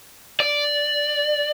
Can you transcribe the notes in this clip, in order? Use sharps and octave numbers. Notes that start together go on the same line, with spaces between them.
D5